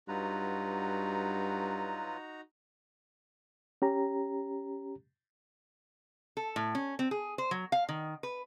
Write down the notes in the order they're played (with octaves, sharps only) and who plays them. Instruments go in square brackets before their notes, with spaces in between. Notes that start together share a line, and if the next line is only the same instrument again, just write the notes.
[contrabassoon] G2 [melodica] F#3 F4 B4 [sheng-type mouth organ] D#4 F#4 A#5
[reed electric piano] C#4 G4 A#5
[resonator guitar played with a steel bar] A4
A2
C#4
C4
G#4
C5
F#3
F5
D#3
B4